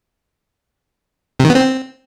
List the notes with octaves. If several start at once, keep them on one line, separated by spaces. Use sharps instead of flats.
C3
D#3
B3
C4